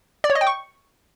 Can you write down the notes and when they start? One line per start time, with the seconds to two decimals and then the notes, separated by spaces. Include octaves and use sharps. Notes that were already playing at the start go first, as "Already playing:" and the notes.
0.24 D5
0.30 C#5
0.35 D#5
0.41 G5
0.47 C#6